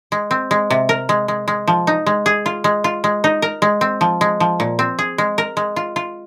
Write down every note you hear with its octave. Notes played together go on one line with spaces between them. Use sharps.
G#3
C4
G#3
C3
A#4
G#3
G#3
G#3
F3
D#4
G#3
G#4
F4
G#3
F4
G#3
D#4
A#4
G#3
C4
F3
G#3
F3
A#2
C4
G#4
G#3
A#4
G#3
F4
F4